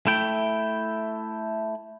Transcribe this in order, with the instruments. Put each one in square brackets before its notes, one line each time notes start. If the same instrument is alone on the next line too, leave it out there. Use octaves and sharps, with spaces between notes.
[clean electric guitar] A3 E4 G5